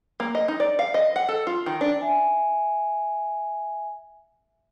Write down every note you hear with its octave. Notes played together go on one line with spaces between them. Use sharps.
A#3
D#5
D#4
D5
F5
D#5
F#5
A4
F4
D#3
D4
E5 G#5